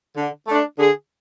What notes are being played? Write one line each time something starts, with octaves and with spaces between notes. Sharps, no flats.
D3
A3 D4
D3 G#4